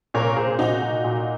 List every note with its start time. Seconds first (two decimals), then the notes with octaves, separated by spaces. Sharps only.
0.14 A#2 A#4 C#5
0.36 A#2 G#4 C5
0.59 A#2 D#4 F#4
0.82 A#2
1.04 A#2